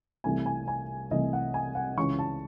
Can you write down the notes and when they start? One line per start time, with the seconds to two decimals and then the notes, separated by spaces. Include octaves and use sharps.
0.24 C2 C3 E3 A3 G#5
0.46 G#5
0.68 G#5
1.11 C2 C3 E3 A3 D#5
1.33 F#5
1.54 G#5
1.75 F#5
1.97 C#2 C#3 E3 C#6
2.19 A5